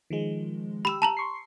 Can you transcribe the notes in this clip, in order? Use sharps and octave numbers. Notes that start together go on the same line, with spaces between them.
D#3 F3 G#3
G4 B5 E6 E7
A5 A#5 F#7
C6 C#6 C7